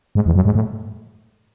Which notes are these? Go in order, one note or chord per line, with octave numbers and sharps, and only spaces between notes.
G#2
E2
F#2
G#2
A2